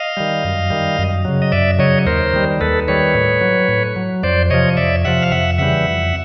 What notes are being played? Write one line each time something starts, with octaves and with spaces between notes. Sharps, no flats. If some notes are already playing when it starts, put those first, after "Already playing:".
Already playing: D#5 F5
D#3 G3
F#2
D#3 G3
F#2
C#3 F#3
D#5
F#2 D5 E5
C#3 F#3 C#5 D#5
D#2 A#4 C5
D#3 G3
D#2 A4 B4
D#3 G3 B4 C#5
A2
F#3
A2
F#3
F2 C5 D5
C3 F3 C#5 D#5
F2 D5 E5
C3 F3 E5 F#5
F5
F2 E5 F#5
C#3 E3 G3 E5 F#5
F2